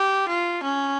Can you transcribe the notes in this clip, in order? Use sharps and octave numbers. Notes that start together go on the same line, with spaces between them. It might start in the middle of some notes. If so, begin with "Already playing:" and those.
Already playing: G4
F4
C#4